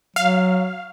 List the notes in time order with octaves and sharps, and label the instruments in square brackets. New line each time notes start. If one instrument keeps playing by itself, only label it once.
[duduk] F#3 [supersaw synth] F5